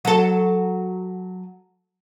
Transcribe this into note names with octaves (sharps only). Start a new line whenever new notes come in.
F#3 A4